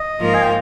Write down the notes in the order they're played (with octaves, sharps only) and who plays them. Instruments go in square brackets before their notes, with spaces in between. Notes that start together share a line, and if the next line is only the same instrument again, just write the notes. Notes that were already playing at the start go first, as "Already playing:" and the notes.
Already playing: [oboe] D#5
[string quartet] G#2 F3 A#3 F4 A#4
[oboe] G#5
G5